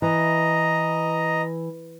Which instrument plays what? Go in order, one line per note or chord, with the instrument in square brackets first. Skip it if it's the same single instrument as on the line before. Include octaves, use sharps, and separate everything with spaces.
[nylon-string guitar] E3 [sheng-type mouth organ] D#5 A#5